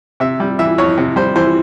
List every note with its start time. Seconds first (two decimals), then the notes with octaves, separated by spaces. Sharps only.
0.20 C3 E5
0.40 G3
0.59 E3 E5
0.78 F2 C#5
0.98 C3
1.16 G3 C5
1.36 E3 C5